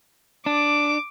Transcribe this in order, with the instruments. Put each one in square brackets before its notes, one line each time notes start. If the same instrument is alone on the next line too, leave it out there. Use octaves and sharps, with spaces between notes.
[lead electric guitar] D4 [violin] D6